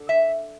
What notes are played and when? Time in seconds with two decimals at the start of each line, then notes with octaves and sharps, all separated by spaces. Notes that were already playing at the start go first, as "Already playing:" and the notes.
Already playing: D3
0.09 E5